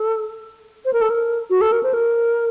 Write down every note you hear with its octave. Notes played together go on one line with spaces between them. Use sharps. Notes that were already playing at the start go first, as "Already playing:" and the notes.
Already playing: A4
C5
A#4
A4
A#4
F#4
A4
A#4
C5
A#4